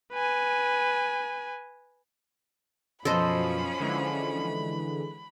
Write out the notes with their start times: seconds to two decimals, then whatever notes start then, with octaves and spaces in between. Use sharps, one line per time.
0.13 B4 G#5
3.05 F#2 B2 F3 C#4 A4 C5 D#5 B5
3.80 D3 E3 G#3